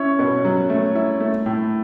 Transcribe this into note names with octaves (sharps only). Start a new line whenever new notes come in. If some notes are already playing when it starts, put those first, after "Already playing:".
Already playing: C#4 E4 C#5
B2
F#3
A3
E4
A3
A2